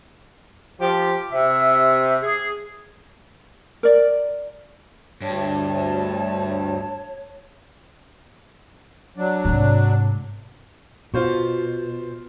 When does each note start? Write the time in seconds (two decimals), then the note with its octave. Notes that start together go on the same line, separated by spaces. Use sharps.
0.80 F3 G4
1.32 C3 E5
2.22 G#4
3.83 A#4 D5
5.21 D2 G2 C#5 A5
9.17 F#3 D4
9.45 G#2 C3
11.14 B2 F4 C5 C#6